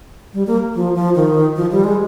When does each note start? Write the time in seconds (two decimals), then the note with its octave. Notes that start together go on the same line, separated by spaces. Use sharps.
0.34 G3
0.47 A#3
0.75 F3
0.95 F3
1.15 D#3
1.56 F3
1.71 G3
1.84 G#3